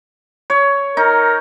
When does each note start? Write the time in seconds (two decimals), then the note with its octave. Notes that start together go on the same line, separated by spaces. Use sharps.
0.50 C#5
0.97 D#4 A#4